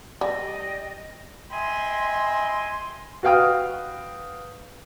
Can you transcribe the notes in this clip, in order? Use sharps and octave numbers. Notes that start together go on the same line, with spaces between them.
G3 D5 D#5 G5
D#5 E5 G5 G#5 B5 C6
F#4 B4 F5 G5 D#6 F6